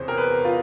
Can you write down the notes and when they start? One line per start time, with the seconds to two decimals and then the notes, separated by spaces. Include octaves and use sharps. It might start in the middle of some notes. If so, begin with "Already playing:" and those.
Already playing: E2 C3 C5 C#5
0.08 A#4
0.18 B4
0.45 F4